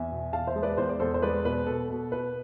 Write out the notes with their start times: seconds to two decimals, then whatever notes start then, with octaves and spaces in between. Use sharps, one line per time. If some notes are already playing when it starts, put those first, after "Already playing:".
Already playing: E2 E5 G#5
0.11 B2
0.33 E2 F5 A5
0.47 C5 E5
0.55 G#3
0.63 B4 D5
0.78 E2 C5
0.89 D5
1.00 E2 A4 C5
1.14 C5
1.22 G#3 B4 D5
1.45 B2 B4
1.66 B2 A4
1.90 B2
2.11 B2 B4